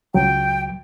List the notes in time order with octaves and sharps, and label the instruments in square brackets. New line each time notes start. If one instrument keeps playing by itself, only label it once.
[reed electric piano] C#2 F#3 [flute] G5